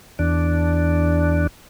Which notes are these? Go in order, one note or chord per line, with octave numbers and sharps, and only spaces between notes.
E2 D4